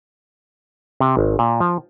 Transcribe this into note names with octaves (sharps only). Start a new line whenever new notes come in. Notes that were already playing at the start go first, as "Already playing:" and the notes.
C3
G#1
A#2
F3